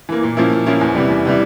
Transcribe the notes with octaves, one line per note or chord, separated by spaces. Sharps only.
E3 A#3
A#2
F3 A#3 C#4 E4
A#2
F3 A#3 C#4 E4
E2
C3 E3 G3
E2
C3 E3 G3